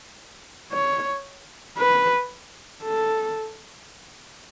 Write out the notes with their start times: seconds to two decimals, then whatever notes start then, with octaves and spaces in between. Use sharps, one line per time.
0.72 C#5
1.78 B4
2.83 A4